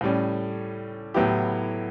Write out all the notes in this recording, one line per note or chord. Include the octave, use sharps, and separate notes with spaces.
A2 G3 C#4
A2 F#3 B3 E4 G4